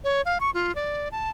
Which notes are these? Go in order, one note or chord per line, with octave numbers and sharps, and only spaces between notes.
C#5
F5
C#6
F4
D5
A5